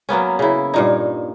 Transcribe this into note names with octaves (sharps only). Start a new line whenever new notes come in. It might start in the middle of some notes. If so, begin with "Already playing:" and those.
F#3 A#3 B3 C#4
C#3 E4
G2 A#2 D#4